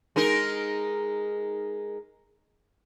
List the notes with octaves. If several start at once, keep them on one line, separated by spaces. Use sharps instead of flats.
G#3 D#4 A#4